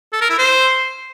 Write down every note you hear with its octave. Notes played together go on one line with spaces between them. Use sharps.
A4
A#4
E4
C5